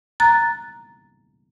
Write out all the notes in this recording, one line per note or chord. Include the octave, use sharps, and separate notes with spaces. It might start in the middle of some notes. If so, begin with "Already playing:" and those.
A#5 F#6 A6